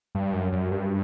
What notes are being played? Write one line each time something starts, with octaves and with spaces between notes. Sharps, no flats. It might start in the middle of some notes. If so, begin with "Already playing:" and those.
G2
F#2
F#2
G2